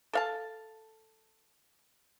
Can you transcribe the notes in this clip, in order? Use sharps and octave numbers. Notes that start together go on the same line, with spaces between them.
A4 F5 A5